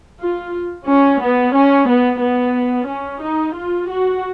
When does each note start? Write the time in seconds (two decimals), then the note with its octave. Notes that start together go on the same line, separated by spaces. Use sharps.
0.21 F4
0.88 C#4
1.21 B3
1.55 C#4
1.88 B3
2.21 B3
2.88 C#4
3.22 D#4
3.55 F4
3.88 F#4